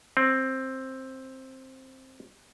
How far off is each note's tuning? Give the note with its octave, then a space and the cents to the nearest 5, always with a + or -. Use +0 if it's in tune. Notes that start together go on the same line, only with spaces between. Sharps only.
C4 +10